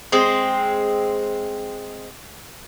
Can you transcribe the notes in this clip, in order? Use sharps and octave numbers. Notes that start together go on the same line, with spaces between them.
G#3 C4